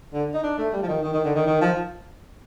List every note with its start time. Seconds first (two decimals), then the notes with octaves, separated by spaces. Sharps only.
0.13 D3
0.34 D#4
0.43 D4
0.58 A3
0.72 G3
0.82 F3
0.87 D#3
1.03 D#3
1.13 D#3
1.24 D3
1.35 D#3
1.46 D#3
1.61 F3